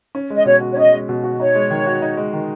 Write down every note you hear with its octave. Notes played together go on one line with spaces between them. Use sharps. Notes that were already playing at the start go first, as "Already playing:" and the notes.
C#4
G#3
D#5
B2 C#5
F#4
C#5
C#4 D#5
G#3
B2
F#4
D#4 C#5
G#3
D#3
F#4
D#4
G#3
D#3